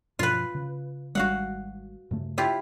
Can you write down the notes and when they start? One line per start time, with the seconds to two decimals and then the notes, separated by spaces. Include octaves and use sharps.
0.19 G2 B2 F3 F4 B4
0.55 C#3
1.15 G#1 G3 G#3 F#4 F5 F#5
2.11 G2 C#3 A3
2.38 E4 F4 G4